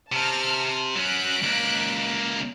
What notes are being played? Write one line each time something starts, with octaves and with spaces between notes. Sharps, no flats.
C3 A5 F6
F#3 C#4 F#6 B6 D7
C#2 A#3